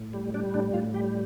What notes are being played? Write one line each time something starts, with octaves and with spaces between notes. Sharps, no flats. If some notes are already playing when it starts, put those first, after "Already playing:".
Already playing: A2
G3
G3 D4
A2 D4
A2 F4
G3 G4